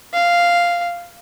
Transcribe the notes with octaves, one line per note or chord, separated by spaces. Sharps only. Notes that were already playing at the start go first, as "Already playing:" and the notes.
F5